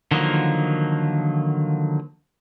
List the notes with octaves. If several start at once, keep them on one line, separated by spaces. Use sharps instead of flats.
D3 D#3 F3 F#3 A#3